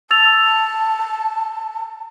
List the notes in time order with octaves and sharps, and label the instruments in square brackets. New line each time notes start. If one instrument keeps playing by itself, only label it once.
[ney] A5 [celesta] E6 A6 F7